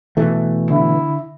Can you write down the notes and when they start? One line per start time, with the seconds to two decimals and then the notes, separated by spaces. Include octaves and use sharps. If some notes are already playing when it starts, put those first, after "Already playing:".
0.17 B2 E3 A3
0.70 D3 E4